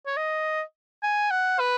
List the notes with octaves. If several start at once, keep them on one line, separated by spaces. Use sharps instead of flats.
C#5
D#5
G#5
F#5
B4